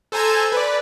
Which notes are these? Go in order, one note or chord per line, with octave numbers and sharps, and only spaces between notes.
A4 C5 G#5 A#5 E6 G#6
B4 D5